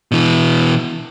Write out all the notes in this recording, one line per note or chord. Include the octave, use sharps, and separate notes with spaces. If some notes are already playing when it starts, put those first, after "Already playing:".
B2 E3